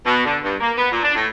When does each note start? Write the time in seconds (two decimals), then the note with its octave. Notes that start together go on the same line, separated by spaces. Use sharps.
0.05 B2
0.26 D3
0.43 G2
0.61 A#3
0.77 B3
0.92 A#2
1.03 D4
1.15 A2